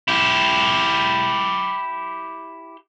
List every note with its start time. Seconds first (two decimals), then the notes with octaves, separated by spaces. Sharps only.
0.08 E4 G4